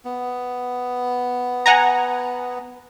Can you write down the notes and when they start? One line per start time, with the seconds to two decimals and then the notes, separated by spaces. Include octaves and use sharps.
0.05 B3
1.66 F#5 G#5 A#5